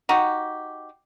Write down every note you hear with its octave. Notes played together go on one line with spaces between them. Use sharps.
D#4 F#4 G4